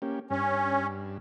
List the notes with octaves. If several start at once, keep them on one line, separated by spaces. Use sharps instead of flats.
A#3 C#4 G4
G2 C#4